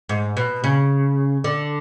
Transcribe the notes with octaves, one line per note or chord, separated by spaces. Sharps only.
G#2
B2
C#3
D3